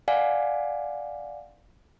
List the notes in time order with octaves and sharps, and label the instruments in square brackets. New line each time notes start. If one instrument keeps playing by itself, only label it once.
[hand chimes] D5 F5 F#5 G#5